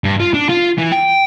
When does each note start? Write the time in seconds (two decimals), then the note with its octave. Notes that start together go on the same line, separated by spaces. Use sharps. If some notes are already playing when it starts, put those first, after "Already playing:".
0.04 G2
0.20 F4
0.34 D4
0.49 F4
0.78 E3
0.92 G5